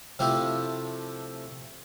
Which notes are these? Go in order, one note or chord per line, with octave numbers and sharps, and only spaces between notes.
C3 F3 A3 E4 G4